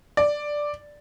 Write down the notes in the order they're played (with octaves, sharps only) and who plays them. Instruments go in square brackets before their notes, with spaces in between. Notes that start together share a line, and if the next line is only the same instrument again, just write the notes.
[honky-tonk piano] D5